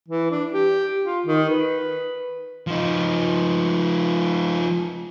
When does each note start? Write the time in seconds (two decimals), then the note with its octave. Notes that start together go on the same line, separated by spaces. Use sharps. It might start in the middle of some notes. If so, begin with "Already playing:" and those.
0.08 E3
0.31 D4
0.54 G4
1.05 F4
1.26 D#3
1.49 B4
2.67 F3 D#4